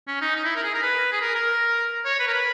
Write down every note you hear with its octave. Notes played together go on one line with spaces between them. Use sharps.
C#4
D#4
D#4
E4
A#4
G#4
A#4
B4
G#4
A#4
A#4
C#5
B4
A#4
B4